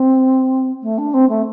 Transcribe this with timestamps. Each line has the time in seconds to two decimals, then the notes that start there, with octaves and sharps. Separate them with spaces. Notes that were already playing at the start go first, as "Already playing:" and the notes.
Already playing: C4
0.82 A3
0.98 D4
1.14 C4
1.29 A3